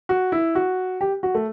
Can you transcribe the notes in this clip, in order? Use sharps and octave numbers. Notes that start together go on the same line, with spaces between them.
F#4
E4
F#4
G4
F#4
A3